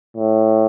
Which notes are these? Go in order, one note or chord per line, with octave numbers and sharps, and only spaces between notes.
A2